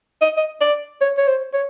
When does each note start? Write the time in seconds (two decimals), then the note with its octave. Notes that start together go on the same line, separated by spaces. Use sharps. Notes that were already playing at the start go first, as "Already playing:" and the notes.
0.21 D#5
0.37 D#5
0.61 D5
1.01 C#5
1.17 C#5
1.27 C5
1.53 C#5